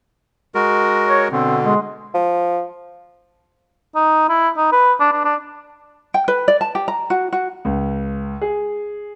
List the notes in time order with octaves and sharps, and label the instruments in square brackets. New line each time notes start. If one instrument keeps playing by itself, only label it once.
[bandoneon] G#3 F#4 A#4
[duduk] C#5
[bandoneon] B2 D3 [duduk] C4
[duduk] G#3
[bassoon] F3
[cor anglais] D#4
E4
D#4
B4
D4
D4
D4
[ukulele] G5
B4
D5
A5
G4
A#5
F#4
F#4
[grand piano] C#2
G#4